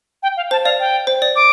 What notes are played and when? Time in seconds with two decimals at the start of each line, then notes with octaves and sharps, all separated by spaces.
0.23 G5
0.37 F5
0.51 C5 A5
0.65 D5 F5
0.79 G5
1.07 C5
1.22 D5
1.36 D6